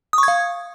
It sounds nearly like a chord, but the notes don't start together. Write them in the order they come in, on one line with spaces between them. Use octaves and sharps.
D#6 C#6 G#6 F5